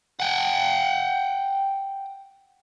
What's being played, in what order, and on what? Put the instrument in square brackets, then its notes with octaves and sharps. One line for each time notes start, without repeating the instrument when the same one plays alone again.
[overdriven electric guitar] F#5 G5